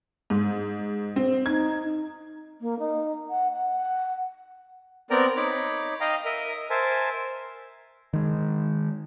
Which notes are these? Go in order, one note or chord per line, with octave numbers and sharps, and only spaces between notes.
G#2
C4
D#4 G#6
A#3
D#4
F#5
F#5
B3 C4 A#4 D5 G5 A#5
D#4 C#5 B5 D6
D#5 F5 G5 A#5
A#4 D#5 E5 D#6
A#4 C5 E5 G#5 A5
D#3 G#3